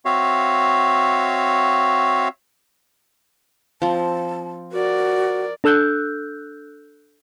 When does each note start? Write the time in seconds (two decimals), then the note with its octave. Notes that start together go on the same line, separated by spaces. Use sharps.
0.05 C4 F#4 C#5 E5 F5
3.82 F3 C4 A5
4.72 F#4 A#4 D5
5.64 D4 A4 E6 F#6 G6